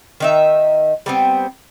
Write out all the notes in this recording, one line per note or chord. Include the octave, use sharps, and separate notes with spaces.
D#3 D#4 E5
G3 B3 C4